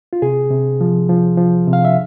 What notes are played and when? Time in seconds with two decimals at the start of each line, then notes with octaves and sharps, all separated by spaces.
0.13 F4
0.22 C3 G#4
0.51 C3
0.81 F3
1.09 F3
1.38 F3
1.67 C3
1.73 F5
1.85 E5